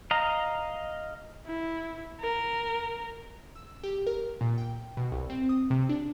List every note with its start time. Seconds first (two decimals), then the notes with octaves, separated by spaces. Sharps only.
0.11 D#5 F5 A#5
1.46 E4
2.20 A#4
3.56 E6
3.84 G4
4.07 A#4
4.41 A#2
4.58 G5
4.97 B2
5.12 C2
5.30 C4
5.49 D#6
5.70 C3
5.89 D4